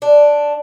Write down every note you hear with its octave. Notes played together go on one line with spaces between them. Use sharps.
D4